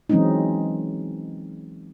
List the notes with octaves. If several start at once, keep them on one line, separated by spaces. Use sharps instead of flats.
E3 F#3 G#3 C4 C#4 D#4